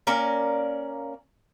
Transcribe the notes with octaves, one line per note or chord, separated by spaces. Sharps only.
A#3 C#4 A#4 D5